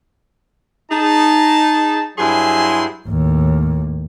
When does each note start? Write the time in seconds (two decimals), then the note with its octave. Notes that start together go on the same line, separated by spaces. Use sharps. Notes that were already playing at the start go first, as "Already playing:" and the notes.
0.91 D#4 G#4 A5
2.18 G2 F#3 E4 G#4 G#5 C6
3.07 D#2 A2